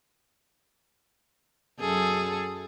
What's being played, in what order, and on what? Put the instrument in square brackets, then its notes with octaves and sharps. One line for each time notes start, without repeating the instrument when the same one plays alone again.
[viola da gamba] F#2 G#4 A4